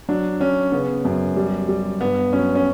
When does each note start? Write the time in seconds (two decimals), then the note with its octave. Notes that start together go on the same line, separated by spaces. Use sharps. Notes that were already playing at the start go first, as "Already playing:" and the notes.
0.09 F#3 D4
0.40 F#3 C#4
0.72 C#3 B3
1.05 F#2
1.36 G3
1.69 G3
2.01 G2 B3
2.33 F#3 C#4
2.55 C#4